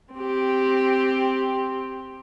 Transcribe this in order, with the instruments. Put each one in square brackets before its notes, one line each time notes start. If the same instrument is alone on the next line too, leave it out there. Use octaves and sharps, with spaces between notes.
[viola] C4 G4